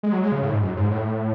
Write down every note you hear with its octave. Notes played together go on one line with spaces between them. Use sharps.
G#3
F#3
G#3
C#3
A2
G#2
F#2
G#2
A2